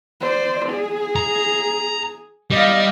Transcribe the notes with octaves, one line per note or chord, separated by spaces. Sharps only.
C5 D5
G#4
A#5
G3 D#5 F5